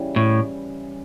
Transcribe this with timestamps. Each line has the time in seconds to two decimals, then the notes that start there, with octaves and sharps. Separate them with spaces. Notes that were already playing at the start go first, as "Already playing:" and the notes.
Already playing: C#3 E3 G3
0.16 A2